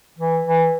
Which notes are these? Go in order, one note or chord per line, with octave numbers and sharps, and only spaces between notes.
E3
E3